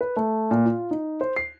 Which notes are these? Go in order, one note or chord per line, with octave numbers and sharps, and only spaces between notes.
B4
A3
A#2
F4
D#4
C5
C7